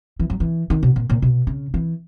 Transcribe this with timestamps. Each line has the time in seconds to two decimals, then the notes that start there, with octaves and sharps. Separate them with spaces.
0.20 E3
0.30 F#3
0.40 E3
0.70 D#3
0.83 B2
0.96 A#2
1.10 A#2
1.22 B2
1.47 C#3
1.74 E3